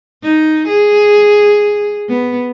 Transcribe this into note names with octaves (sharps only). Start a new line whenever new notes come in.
D#4
G#4
B3